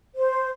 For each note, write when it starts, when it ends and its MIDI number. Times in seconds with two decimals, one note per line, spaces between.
0.15 0.48 72